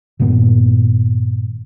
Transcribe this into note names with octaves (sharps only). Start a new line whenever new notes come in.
G2 A#2 D#3 B3